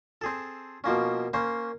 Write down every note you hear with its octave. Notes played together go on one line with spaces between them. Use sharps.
C4 G#4 A4
B2 F3 A#3 C#4
A#3 C#4 C5